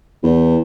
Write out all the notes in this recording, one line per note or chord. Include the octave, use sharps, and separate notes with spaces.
E2